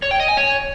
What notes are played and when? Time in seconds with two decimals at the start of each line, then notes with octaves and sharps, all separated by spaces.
0.02 C#5
0.11 G5
0.20 D#5
0.28 G#5
0.37 C#5